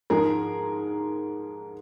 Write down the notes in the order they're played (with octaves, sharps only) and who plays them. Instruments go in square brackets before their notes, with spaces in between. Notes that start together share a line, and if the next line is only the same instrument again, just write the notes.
[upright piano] G#2 F3 G#3 G#4 A#4